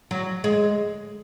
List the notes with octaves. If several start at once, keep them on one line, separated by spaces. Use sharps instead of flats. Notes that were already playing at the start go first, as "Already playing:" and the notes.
F#3
G#3